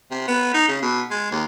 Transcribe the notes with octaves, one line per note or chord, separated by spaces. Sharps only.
C3
B3
D#4
C#3
B2
G#3
D#2